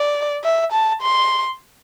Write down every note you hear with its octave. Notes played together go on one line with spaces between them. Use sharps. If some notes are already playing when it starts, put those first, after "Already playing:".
Already playing: D5
E5
A5
C6